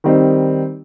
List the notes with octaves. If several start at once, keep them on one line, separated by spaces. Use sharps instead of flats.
D#3 G3 C4 D#4